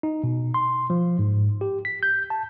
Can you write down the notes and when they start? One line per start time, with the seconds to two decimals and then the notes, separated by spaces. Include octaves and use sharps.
0.03 D#4
0.23 B2
0.54 C6
0.90 F3
1.19 G#2
1.61 G4
1.85 B6
2.03 G6
2.30 A5